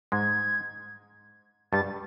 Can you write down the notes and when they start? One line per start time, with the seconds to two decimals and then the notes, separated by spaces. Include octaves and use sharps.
0.12 G#2 G#3 G#6
1.73 G2 G3 A6